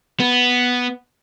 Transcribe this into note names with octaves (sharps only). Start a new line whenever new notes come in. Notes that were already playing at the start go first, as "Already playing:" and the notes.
B3